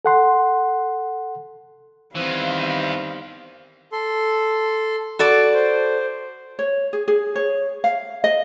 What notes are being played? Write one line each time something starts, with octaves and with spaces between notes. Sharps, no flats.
A4 F#5 C6
E2 D#3 E3 G3 C4 F5
A4 C6
F#4 A4 D5
C5
C#5
G#4
G#4
C#5
F5
D#5